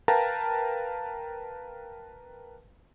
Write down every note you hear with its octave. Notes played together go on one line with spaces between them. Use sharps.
A#4 B4 F5 G5 A5 A#5